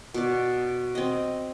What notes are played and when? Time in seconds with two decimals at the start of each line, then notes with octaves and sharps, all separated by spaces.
0.14 B2 D5
0.95 C4 D#5